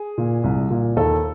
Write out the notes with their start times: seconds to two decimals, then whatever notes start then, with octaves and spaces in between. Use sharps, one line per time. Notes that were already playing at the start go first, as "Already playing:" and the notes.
Already playing: G#4
0.18 A#2
0.44 C2
0.70 A#2
0.96 D#2 A4